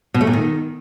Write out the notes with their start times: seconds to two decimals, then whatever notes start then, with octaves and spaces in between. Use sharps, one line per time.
0.14 B2
0.21 A3
0.27 A#2
0.33 D#3